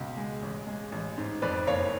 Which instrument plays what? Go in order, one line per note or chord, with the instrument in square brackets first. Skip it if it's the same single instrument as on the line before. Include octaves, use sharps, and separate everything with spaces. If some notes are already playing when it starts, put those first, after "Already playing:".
Already playing: [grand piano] C#2 B2 G#3
G#3
A1
G#3
A1
G#2
F2 B4 D5
F#1 C#5 F5